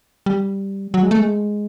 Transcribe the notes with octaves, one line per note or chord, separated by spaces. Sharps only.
G3
F#3
G#3
A3
G#3